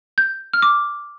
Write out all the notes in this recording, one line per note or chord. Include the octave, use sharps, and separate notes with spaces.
G6
F6
D6